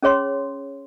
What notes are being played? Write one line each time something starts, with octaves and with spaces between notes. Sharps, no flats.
C#4 G#4 C#5 C6